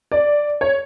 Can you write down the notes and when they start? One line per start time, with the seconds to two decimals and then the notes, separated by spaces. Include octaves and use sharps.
0.12 D5
0.61 C#5